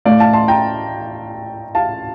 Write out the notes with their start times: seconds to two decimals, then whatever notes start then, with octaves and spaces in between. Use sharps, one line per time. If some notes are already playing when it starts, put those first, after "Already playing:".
0.05 A2 A3 D5 F5
0.20 F5 A5
0.33 A5 C6
0.48 G5 A#5
1.75 F5 A5